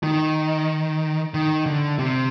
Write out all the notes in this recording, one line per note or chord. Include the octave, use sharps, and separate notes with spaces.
D#3
D#3
D3
C3